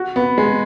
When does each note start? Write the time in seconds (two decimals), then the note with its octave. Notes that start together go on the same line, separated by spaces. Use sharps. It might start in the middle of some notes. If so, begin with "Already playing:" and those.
Already playing: F#4
0.16 B3
0.38 G#3